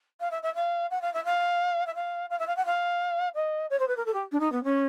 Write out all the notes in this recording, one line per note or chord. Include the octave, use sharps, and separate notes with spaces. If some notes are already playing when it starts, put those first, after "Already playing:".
F5
E5
E5
F5
F#5
F5
E5
F5
E5
F5
F5
E5
F5
F#5
F5
D#5
C#5
C5
B4
A#4
A4
G4
D4
D#4
B3
C#4